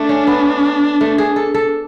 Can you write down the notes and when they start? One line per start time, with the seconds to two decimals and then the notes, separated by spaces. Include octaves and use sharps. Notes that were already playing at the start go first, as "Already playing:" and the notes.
Already playing: A3 D4
0.09 C#4
0.27 B3
1.01 A3
1.18 G#4
1.36 A4
1.54 A4